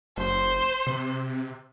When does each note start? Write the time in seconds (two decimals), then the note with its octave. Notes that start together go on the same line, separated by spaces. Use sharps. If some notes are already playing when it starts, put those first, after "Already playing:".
0.17 F#1 C5
0.87 C3